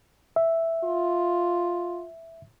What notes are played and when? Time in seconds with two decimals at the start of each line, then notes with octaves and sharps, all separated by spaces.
0.36 E5
0.84 F4